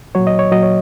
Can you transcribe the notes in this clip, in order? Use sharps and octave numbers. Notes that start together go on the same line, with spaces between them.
A#2 F#3 C#5
D#5
C#5
A#2 F#3 D#5
C#5